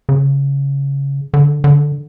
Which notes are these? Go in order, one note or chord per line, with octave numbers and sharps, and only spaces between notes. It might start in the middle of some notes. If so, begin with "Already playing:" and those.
C#3
D3
D3